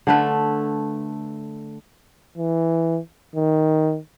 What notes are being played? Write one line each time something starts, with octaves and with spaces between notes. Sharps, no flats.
D3 A3 B4
E3
D#3